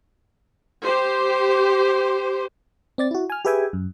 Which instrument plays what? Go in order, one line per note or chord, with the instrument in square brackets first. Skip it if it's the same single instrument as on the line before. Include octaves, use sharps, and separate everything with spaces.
[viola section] G4 C5
[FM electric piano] C4 D5 A6
E4 F#4
G#5 F6
G4 G#4 B4 E5 G5 G#5
F#2